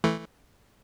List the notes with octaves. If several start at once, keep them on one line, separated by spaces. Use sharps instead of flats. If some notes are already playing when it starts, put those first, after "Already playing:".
E3 A3